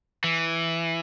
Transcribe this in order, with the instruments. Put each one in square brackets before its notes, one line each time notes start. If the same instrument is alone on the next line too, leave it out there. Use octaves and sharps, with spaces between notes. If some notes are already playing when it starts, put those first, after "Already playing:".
[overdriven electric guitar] E3